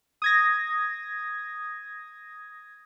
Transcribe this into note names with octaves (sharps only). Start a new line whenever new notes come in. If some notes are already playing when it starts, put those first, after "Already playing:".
D#6 G#6 A#6